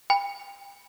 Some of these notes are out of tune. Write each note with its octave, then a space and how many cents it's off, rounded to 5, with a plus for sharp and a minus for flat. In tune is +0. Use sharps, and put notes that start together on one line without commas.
G5 +35 B5 +0